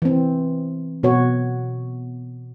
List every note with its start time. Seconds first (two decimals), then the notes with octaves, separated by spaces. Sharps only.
0.02 E3 C4
1.03 B2 F#4 C#5